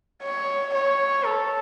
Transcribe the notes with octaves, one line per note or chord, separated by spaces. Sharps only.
C#5
C#5
A4